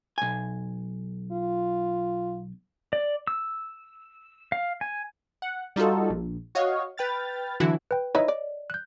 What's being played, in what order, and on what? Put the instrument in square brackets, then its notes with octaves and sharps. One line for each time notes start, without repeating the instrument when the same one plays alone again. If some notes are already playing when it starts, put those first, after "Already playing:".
[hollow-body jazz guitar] B1 G#5
[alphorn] F4
[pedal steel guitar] D5
E6
F5
G#5
[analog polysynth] F#5
G3 D#4 F4 F#4 A4
A#1
F#4 C#5 D#5 F5
B4 G5 F6 A6
D3 E3 F#3 E4 F#4
[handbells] B4 G5
[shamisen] D#4 E4 B4 [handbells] C#5 D#5
[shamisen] D5
[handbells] F#6 G6